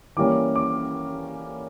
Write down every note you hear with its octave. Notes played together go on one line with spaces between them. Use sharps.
E3 G3 A#3 C#4 D6
D6